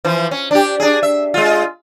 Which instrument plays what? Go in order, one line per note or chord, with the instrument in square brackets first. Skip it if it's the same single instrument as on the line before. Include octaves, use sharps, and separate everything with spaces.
[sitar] E3 F3
C#4
D4 G4
D4 G#4
E5
G#3 F4